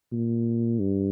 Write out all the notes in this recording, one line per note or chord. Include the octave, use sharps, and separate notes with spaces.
A#2
G2